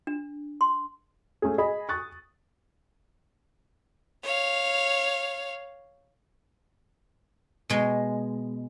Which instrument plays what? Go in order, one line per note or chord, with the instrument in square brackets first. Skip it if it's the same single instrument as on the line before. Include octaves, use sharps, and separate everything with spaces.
[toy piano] D4
C6
[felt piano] A3 C#4 G#4
G#4 D#5 B5
C#6 D#6 F#6 A6
[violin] C#5 F5
[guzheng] B2 G#3